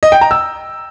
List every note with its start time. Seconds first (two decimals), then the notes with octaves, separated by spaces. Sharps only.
0.03 D#5
0.12 G5
0.21 A#5
0.31 E6